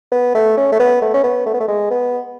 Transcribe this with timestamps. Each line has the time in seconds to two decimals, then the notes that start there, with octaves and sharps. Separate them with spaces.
0.12 B3
0.35 A3
0.57 C#4
0.72 A3
0.80 B3
1.02 A3
1.14 C#4
1.24 B3
1.46 A3
1.54 B3
1.60 A3
1.68 G#3
1.91 B3